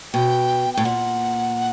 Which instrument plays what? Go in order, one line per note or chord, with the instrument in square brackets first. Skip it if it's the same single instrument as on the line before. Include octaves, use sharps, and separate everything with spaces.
[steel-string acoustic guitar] B2 [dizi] G5
[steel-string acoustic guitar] A2 [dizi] G5
[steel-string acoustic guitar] A#2 [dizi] F#5